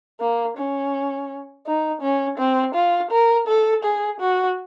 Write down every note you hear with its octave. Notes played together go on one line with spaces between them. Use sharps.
A#3
C#4
D#4
C#4
C4
F4
A#4
A4
G#4
F#4